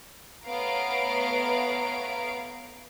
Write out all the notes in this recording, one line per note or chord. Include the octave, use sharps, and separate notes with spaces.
A3 B3 C#5 F5 A#5 D7